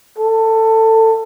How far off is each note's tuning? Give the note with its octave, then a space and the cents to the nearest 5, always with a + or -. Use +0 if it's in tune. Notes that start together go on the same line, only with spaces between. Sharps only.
A4 +20